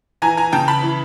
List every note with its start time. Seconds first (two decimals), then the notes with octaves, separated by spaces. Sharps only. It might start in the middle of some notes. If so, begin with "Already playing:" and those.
0.22 E3 G#5 A#5
0.37 G#5 A#5
0.52 C#3 G5 A5
0.68 A5 B5
0.83 E3